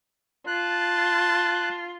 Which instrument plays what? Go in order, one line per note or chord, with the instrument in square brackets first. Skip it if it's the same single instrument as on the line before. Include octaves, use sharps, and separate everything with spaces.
[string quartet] F4 [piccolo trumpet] A5 [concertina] F#6